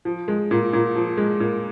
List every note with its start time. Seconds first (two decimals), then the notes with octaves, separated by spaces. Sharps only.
0.05 F3
0.28 G#3
0.51 A#2
0.73 A#2
0.95 F3
1.17 G#3
1.40 A#2